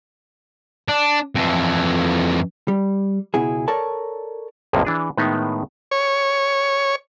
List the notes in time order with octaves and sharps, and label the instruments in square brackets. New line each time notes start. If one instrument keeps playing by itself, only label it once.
[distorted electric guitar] D4
F2 E3
[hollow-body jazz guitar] G3
C#2 B2 E4 G#4
A4 A#4 C#5 D5 A5
[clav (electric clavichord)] B1 F2 A2 C3 F3 A#3
E3 D4 G#4
A2 D#3 G#3 B3 D#4
[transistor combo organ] C#5